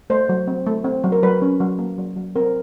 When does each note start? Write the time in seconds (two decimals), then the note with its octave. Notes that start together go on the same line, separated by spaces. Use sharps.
0.10 A3 C5
0.29 F#3
0.48 C4
0.66 A3
0.84 C4
1.04 F#3
1.12 A#4
1.23 F#3 B4
1.42 C#4
1.60 F#3
1.79 A#3
1.98 F#3
2.16 F#3
2.36 C4 A#4